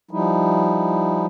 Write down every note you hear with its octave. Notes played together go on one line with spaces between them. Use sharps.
F3 G3 D#4 E4